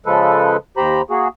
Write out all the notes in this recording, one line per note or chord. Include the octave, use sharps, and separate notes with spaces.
C#3 F3 G#3 A4 B4
D#2 G4 C5 A#5 B5
A#3 F#4 G#4